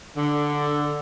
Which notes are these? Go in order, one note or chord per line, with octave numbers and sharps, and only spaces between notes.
D3